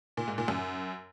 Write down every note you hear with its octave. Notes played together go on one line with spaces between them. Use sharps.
A#2
G#2
A#2
F#2